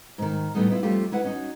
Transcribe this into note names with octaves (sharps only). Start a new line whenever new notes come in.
G#2 D#3
A2 G3 A3 B3 D#4 G#4
B3 E4 F4
F2 G3 A3 F4 G4
G#3 E4 B4 F#5
C#4 D#4 F#4